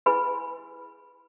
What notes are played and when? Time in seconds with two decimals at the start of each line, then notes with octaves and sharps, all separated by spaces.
0.06 E4 G#4 B4 G#5 B5